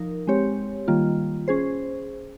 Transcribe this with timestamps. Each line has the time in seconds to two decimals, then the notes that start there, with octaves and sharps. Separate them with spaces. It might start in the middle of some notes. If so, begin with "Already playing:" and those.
Already playing: F3 D#4 A#4
0.27 G#3 C4 G4 C#5
0.88 D#3 G3 A#3 F4
1.48 C#4 G#4 C5